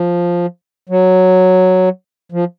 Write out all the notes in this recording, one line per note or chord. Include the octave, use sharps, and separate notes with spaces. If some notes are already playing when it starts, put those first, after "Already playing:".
Already playing: F3
F#3
F3